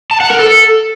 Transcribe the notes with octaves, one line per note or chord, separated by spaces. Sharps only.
A5
F#5
A#4
A4